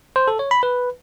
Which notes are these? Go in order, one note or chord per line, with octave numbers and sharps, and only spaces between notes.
C5
A4
C#5
B5
B4